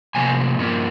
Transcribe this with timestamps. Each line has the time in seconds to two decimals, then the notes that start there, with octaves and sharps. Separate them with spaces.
0.15 C3 F3 A#3 G#5
0.58 G2 F3 A#3